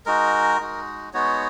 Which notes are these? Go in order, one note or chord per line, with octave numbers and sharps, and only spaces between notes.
G#3 D#4 F#4 A#4
G#3 D#4 F#4
G#3 B3 D#4 F#4 C#5